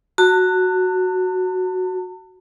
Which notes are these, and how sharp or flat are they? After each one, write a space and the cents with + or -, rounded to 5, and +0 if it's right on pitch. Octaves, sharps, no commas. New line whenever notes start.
F#4 +0 A5 +40